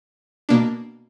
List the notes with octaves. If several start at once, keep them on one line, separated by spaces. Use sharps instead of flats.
B2 A#3 D4